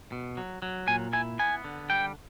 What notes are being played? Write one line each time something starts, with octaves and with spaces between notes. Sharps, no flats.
B2
F#3
F#3
A#2 G#5
E4 G#5
B3 G#5
D3
G3 G5